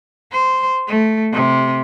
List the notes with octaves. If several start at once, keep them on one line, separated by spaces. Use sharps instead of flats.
C5
A3
C3